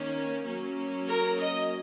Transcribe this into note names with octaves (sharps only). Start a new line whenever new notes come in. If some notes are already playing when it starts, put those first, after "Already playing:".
Already playing: D#3 A#3 C#4
F#3 A#3 C#4
A#4
D#5